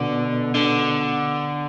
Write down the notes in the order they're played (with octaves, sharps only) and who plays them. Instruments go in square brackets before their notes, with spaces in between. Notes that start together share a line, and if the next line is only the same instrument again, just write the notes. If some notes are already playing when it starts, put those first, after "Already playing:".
Already playing: [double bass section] B2 [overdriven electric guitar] D3
[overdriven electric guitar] D3